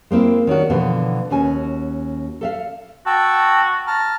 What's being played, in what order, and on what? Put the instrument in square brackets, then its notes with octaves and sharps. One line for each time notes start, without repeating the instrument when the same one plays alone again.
[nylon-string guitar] G#3 A#3 C4 E4
D#3 C#4 D4 F#4
B2 D3 E3 F3 B3
D#2 C#4 F#4 G#5
A4 E5 F5
[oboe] F#4 [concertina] G5 A5 E6
[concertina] A5 A#5 F6